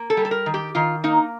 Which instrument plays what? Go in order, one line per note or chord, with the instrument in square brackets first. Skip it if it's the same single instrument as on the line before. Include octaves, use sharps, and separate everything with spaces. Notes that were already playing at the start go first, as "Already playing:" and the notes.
Already playing: [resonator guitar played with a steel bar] A#3
A4
G3
A4
A#4
D#3
G4
D#3 F4
A#3 D#4